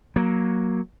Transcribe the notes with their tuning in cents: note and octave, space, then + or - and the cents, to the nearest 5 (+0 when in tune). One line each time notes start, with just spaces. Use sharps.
F#3 +0 A#3 +10